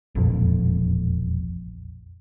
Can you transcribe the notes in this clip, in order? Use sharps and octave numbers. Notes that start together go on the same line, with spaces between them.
E1 A#1 F2